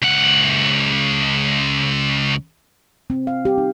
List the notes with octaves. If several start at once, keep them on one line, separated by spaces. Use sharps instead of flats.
C#2 F#5
C4
F5
G4
D#4